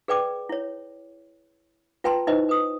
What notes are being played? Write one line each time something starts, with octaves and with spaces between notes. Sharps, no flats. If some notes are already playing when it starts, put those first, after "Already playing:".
G#4 B4 D5 G5 D6
E4 C#5
F4 B4 G5 A5 A#5 C6
D#4 E4 B4 C5 D#5
B4 D#6